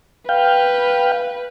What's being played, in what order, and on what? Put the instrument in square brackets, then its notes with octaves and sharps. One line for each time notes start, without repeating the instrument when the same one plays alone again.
[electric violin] B4 [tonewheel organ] F5 G5